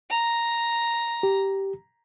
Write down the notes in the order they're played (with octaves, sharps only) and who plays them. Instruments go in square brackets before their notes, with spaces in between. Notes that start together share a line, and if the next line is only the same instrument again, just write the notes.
[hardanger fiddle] A#5
[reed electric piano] G4